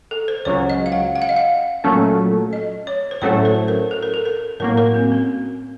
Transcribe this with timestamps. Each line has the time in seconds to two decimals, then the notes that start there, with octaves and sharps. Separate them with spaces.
0.11 A4
0.28 C5
0.45 C#2 C#3 F#3 C#5
0.70 D#5
0.86 F5
0.92 F#5
1.16 F#5
1.22 F5
1.29 D#5
1.36 F5
1.84 A#2 F#3 A3 C#4 A4
2.53 D#5
2.87 C#5
3.11 C5
3.22 A2 F#3 A3 C#4 A4 C#5
3.45 C5
3.68 A#4
3.91 A4
4.03 A#4
4.14 A4
4.25 A#4
4.60 A2 F#3 A#3 A#4
4.77 A#4
4.94 C4
5.12 C#4